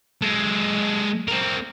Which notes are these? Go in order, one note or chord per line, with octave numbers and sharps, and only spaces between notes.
G#3 A4
C4 A#4